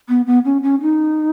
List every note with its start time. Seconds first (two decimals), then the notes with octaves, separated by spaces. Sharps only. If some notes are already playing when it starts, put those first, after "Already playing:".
0.09 B3
0.27 B3
0.45 C#4
0.63 C#4
0.82 D#4